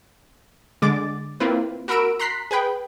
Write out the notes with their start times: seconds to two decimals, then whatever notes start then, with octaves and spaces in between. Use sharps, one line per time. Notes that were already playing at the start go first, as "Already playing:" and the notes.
0.82 D3 G#3 D6 A6
1.40 A#3 C4 E4 F4 B4
1.88 F#4 A#4 B5 E6 D7 E7
2.19 A#5 C6 F#6 B6 C7
2.51 G#4 B4 G5 B5